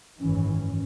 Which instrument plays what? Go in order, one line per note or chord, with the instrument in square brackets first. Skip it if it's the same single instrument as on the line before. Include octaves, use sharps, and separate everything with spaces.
[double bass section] G#1 F#2 E3 [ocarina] C#4